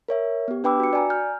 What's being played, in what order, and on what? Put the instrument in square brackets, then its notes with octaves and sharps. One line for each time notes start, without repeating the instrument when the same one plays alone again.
[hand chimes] A#4 C#5 E5
B3 G4
D4 B4 G5 B5 D6 E6
F#4 C#7
D5 G#5 A#5
F6 G6